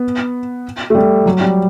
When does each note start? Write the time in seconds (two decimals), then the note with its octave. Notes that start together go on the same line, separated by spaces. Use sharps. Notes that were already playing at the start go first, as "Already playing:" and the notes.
Already playing: B3
0.90 A3
0.95 G3
1.26 F#3
1.41 G3